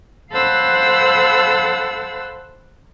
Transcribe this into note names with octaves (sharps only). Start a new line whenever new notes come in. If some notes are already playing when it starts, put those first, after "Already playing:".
A4 C5 F5 F#5 B5 E6